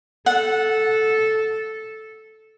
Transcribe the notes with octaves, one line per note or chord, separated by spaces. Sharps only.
A4 F#5